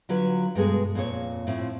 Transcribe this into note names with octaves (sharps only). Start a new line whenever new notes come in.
D3 F#3 F4 B4
G2 B2 G#3 B3 G#4 A4
F2 A#2 C#5
A2 F3 C4